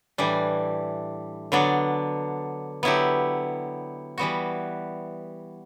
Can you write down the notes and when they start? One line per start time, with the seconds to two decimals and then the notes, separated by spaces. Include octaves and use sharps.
0.18 A2 E3 G3 D4
1.52 D3 F#3 B3 D4
2.83 D3 F#3 B3 E4 G4
4.18 E3 G3 B3 F#4